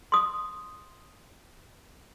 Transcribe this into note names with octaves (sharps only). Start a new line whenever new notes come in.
C6 D#6